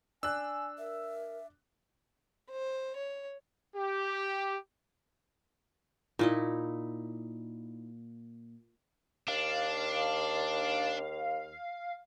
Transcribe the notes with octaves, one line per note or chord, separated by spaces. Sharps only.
D4 G#5 E6 F#6
A#4 E5
C5
C#5
G4
A#2 D#4 E4 D#5
D#2 D4 F5